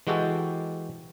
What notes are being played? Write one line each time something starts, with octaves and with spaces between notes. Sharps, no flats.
E3 G#3 F#4 G4 A4